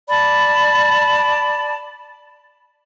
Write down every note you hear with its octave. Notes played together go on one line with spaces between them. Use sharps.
D5 A5 B5